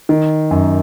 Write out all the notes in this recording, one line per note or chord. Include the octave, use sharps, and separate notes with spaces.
D#3
F#2